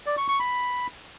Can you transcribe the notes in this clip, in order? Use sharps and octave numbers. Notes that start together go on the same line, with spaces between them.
D5
C#6
C#6
B5